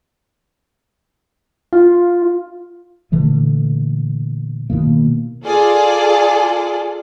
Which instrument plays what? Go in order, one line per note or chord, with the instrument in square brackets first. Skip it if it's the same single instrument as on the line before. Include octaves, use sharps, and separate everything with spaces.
[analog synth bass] F4
[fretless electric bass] A#2 D3 E3 A3
B2 D#3 A#3
[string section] F4 G#4 A4 D5